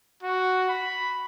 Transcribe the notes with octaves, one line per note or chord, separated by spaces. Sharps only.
F#4
B5